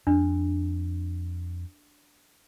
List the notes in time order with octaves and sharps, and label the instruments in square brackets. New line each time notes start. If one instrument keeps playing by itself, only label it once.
[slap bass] F2 [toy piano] D4